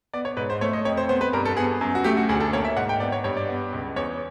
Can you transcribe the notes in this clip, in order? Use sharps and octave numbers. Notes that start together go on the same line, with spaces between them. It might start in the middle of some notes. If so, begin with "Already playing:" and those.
B3 D5
C#5
G#2 B4
C5
A3 C#5
D#5
F2 C#5
C5
B3 C5
B4
G2 A#4
A4
B3 G#4
F#2
F#4
A3 G4
F#4
D2 G#4
A4
A#3 C#5
E5
G#2 F#5
G5
B3 D5
C#5
G2 C#5
D5
B3
C#2
E2 C#5